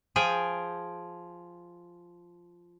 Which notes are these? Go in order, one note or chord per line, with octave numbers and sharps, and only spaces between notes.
F3 G#4 G5 G#5